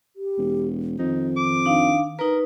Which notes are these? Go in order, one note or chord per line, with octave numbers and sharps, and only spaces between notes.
G4
E1
F2 D#3 D#4
D6
D4 D#4 F5
D#4 A#4 B4